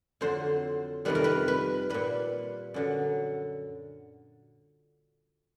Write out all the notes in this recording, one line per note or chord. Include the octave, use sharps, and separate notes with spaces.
F2 D3 F#3 C5
F2 C3 D#3 G3 B4
A#4
B4
B4
A#2 G3 B4
F#2 D3 F#3